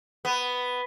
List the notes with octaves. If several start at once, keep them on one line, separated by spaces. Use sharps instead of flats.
B3